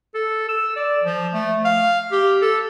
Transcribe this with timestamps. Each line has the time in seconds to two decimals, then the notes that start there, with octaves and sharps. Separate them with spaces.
0.14 A4
0.49 E6
0.76 D5
1.03 F3
1.34 A3
1.65 F5
2.12 G4
2.42 A4